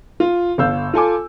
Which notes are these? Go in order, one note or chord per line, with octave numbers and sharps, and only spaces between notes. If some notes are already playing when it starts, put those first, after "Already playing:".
F4
G1 F5 E6 G6
F4 A4 G#5 D6